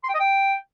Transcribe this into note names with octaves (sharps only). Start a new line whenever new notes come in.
C6
G5
D#5
G5